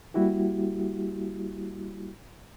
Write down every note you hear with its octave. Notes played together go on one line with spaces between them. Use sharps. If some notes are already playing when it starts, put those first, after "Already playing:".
G3 A#3 E4 F#4 G4